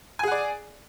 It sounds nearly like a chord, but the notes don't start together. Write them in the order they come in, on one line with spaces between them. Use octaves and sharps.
G#5 G#4 F#5 D5